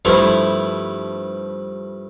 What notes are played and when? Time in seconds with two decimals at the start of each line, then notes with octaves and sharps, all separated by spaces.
0.05 G2 F3 A3 E4